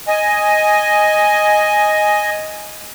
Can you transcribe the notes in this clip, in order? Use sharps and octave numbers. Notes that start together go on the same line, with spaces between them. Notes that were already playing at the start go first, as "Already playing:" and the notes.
D#5 G#5